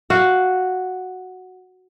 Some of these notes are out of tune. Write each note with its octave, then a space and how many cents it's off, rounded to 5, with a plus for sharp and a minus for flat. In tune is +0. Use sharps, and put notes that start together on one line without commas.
F#4 +0 F5 +0